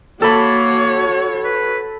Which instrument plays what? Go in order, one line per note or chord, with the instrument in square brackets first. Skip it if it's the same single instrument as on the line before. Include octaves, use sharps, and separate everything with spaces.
[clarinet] A#3 [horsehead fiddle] F#4 C#5 [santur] A4 B5
[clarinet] B4